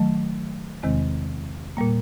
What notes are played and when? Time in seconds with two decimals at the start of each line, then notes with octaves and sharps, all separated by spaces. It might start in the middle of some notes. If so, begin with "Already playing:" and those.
Already playing: D#3 F#3 A3
0.83 E2 C3 D#3 G#3 C4
1.77 A#2 G3 A#3